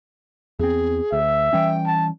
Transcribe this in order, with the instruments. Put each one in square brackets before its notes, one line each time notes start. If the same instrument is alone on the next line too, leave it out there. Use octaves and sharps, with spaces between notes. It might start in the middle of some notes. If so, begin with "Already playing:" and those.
[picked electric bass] E2 C4 [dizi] G#4
[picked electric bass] D2 [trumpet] E5
[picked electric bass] E3 G3 C#4 [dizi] G5
[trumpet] A5